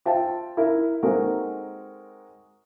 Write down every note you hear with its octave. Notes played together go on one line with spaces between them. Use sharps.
F4 C5 E5 G5 A5
E4 A#4
G#3 C4 D#4 F#4 A4 A#4